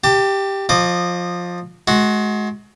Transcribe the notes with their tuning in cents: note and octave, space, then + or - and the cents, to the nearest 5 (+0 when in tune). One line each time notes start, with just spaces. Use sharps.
G4 +0 A5 +30
F3 +15 D#5 -20 D6 +0
G#3 +30 F#4 +0